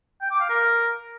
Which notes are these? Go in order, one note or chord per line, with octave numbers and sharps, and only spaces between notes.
G5
D6
F5
A#4